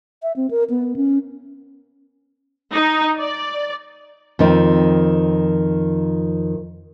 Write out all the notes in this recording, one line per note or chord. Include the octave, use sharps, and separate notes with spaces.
E5
C4
A#4
B3
C#4
D#4
D5
F2 D#3 C4